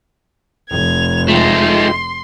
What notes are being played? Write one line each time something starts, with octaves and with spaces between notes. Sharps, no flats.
F1 G#6 F7
G#3 A3 D#4 F4 G5 C6